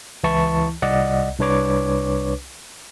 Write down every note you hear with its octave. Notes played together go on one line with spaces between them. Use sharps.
C#2 E3 E4 A5 C#6
C2 D5 D#5 F#5
C2 D4 B4 C#5 D6